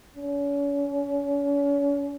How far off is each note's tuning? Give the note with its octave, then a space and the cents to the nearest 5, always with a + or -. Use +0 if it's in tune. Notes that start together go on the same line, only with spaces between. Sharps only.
C#4 +40